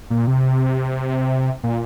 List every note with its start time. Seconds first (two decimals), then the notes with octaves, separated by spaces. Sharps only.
0.10 A#2
0.27 C3
1.64 A#2